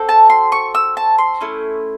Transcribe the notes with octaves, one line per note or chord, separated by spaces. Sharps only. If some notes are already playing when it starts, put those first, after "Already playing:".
Already playing: C4 F#4 A4
A5
C6
C#6
E6
A5
C6
A3 C#4 E4